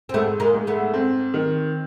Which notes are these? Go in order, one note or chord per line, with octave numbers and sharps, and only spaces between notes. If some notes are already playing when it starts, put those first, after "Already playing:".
C4
G#2 A3 B3
G#3 A#3
G#2
A3 B3
C4
D#3